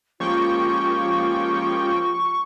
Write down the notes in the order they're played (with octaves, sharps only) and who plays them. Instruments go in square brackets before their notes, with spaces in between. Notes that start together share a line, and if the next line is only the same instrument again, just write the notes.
[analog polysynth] F3 A#3 G5 [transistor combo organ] G#3 C#4 G4 [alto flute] F4 [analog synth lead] C#6